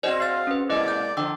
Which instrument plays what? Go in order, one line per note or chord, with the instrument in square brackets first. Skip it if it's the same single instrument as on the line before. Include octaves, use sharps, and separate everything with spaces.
[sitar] C4 F#4 G#4 [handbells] C5 D5 D#5
[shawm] F5 [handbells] A6 C7
[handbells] C#4 B4
[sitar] B2 G#3 A#3 [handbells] E4 D#5 [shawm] D5
[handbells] G6
[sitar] D3 F3 [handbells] G5 D6 E6